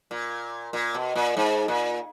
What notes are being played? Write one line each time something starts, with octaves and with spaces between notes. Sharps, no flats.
A#2
A#2
B2
A#2
G#2
A#2